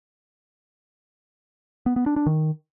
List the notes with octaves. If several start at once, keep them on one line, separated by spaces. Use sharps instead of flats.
B3
B3
D4
D4
D#3